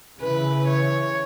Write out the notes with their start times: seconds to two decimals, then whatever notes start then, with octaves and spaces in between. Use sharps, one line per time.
0.20 C#3 E3 B4
0.68 C#5